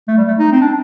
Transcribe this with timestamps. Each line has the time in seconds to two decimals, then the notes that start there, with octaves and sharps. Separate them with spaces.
0.08 A3
0.18 G3
0.28 A3
0.39 D#4
0.52 C4
0.61 D4